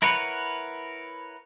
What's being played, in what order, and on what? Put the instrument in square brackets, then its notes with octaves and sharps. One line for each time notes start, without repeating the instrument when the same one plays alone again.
[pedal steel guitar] E4 A#4 B4 C#5 F#5